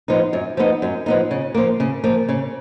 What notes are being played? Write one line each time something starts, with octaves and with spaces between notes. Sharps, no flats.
F3 B3 D#4
F#2
F3 B3 D#4
F#2
F3 B3 D#4
C#3
F3 A#3
C#3
F3 A#3
C#3